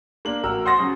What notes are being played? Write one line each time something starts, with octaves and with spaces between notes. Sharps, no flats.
A#3 D4 F#7
A1 F#4 A#4 E6
C5 F#5 C6 D#6 A6 A#6
C#3 F#3